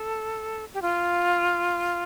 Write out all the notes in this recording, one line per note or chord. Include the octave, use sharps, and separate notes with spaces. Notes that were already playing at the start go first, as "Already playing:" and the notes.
Already playing: A4
G4
F4